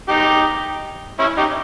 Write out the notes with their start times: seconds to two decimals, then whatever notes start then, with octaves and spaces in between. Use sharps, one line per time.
0.09 D#4 G4
1.19 C#4 E4
1.38 D#4 G4